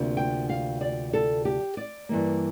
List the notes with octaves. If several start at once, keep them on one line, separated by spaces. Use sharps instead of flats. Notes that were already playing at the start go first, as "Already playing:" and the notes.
Already playing: D2 C3 F3 A#3 D4
G5
F5
D5
A4
G4
D5
G2 E3 A#3